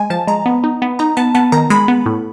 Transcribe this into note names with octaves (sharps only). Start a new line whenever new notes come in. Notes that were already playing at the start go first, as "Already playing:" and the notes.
Already playing: G#3 G#5
F3 A5
G#3 A#5
B3
D#4
B3
D#4 A#5
B3 A5
B3 A5
D#3 A#5
G#3 B5
B3
A2